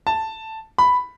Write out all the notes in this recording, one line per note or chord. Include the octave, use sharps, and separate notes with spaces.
A5
B5